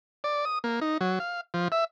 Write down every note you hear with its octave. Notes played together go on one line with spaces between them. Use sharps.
D5
D#6
A#3
D#4
F#3
F5
F3
E5